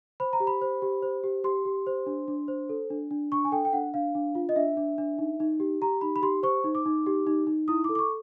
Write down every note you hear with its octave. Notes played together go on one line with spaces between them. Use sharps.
C5 B5
A#5
G4
B5
C5
G4
C5
G4
G4 C6
G4
C5
D4
D4
C5
A4
D4
D4
D4 C#6
G#5
A4 G5
G5
D4 F#5
D4 F5
D4
F4
D#5
D4 E5
D4
D4
D#4
D#4
G4
G4 A#5
D#4 B5
B5
G4 C6
C5 C#6
D#4
D6
D#4
G4
D#4
D#4
E4 D#6
D6
A4
D6
C#6